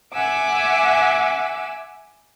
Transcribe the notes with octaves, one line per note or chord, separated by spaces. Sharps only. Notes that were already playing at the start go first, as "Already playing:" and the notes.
E5 F#5 G#5 D6 E6